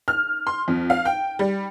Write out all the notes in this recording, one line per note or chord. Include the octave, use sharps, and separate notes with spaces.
F6
C6
F2
F5
G5
G3